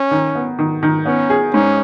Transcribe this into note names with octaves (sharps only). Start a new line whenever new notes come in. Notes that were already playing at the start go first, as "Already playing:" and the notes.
Already playing: C#4
D#3
B3
D#3
D#3
B3 C#4
G#4
G#2 C#4